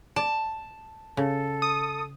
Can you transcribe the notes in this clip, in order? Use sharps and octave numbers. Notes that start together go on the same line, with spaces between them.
D5 A5
C#3 A4
D#6